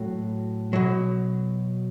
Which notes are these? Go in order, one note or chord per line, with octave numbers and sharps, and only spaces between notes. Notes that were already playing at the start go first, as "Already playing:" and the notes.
Already playing: A2 F#3 F#4
B2 F#3